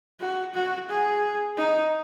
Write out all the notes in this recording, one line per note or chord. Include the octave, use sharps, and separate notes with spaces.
F#4
F#4
G#4
D#4